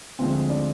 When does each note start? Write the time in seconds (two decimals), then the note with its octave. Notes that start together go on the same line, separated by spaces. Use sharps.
0.19 D2 D3 F3 G#3 C4
0.50 D4